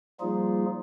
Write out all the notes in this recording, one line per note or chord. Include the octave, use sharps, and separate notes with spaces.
F3 G3 A#3 D#4 F4 G#4